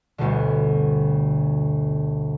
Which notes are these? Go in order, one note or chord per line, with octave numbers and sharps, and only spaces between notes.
G1 D2 B2 D3